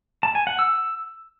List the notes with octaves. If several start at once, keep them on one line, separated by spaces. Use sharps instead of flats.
A5
G#5
F#5
E6